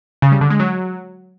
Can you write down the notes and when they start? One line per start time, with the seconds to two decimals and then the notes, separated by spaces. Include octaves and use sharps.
0.22 C#3
0.32 G3
0.41 D3
0.50 G#3
0.59 F#3